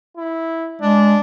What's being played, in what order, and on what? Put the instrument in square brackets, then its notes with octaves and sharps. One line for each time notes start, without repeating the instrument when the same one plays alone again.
[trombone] E4
[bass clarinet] G#3 [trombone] D4